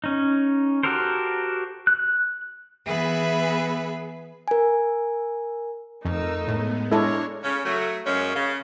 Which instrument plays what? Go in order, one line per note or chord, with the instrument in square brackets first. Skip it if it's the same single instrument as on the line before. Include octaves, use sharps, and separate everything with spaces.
[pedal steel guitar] C#4 D#4
F#4 G4 A4 A#4 C5
F#6
[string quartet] E3 B3 G#4 B4 E5 B5
[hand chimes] A#4 G#5
[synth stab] F2 [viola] A3 D#4 [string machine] A#4 E6
[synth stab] A2 [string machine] G#3 B3
[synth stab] G#3 [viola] D4 C#5 [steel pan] E4 A4 [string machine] A#5 C6 F6
[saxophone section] C#3 C#4
F#3 A3
F#2 F#3 G#3 A#3 C#4
C#3